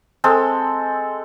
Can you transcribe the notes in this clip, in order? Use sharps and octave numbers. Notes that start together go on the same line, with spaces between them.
G#3 C4 A4